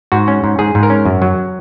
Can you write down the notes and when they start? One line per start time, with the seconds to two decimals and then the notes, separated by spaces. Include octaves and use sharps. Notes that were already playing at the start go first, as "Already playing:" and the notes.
0.12 G#2 F#4
0.28 C#4
0.44 G#2
0.59 G#2 G#4
0.75 G#2
0.83 A#4
0.90 C#4
1.05 F#2
1.22 F#3